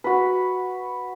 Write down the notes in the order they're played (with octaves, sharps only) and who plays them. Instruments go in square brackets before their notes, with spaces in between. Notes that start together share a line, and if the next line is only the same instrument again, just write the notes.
[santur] F#4 B4